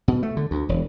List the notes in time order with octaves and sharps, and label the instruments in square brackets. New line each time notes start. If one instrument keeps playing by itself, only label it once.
[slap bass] B2
A3
D3
D2
E1